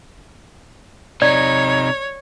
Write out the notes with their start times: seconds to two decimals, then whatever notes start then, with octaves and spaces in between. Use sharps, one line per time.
1.22 C3 D#4 C#5 D5